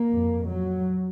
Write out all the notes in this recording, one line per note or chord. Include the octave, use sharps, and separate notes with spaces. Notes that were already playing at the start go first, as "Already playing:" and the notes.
Already playing: A#3
F2
F#3